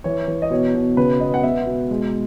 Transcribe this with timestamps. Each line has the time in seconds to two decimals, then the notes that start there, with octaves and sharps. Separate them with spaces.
0.04 E3 C#5
0.28 E3
0.42 D#5
0.50 B2 C#5
0.74 B2
0.97 C#3 B4
1.20 B3 D#5
1.34 F#5
1.43 B3 E5
1.67 B2
1.90 G#3